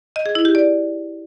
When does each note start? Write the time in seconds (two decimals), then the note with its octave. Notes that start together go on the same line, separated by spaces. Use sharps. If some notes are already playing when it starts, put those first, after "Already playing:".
0.16 D#5
0.26 G#4
0.35 E4
0.45 G4
0.55 D5